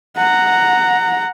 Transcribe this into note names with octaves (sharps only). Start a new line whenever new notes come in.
F#5 A#5